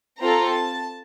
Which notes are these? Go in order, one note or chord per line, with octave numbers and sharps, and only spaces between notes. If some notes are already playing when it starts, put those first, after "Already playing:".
C4 F4 A4 A#5
A5